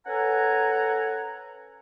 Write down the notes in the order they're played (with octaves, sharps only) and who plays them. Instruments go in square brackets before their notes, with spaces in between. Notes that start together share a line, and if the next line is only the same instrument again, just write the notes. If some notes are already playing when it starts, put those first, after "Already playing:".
[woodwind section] C#4 A4 B4 F#5 G#5 A#5